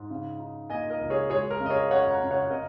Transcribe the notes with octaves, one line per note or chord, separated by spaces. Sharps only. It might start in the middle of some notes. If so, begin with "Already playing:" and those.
Already playing: G#2
C#3
D#4
A#3 D#5 G#5
A#4 D#5
C#2
G#4 C#5
G#3 G#4 C#5
A#4
C#3
D#5
G#4 C#5
C#4 C#5 F#5
F#5 A#5
C#3
C#5 F#5
F#5
C#3 A#4 D#5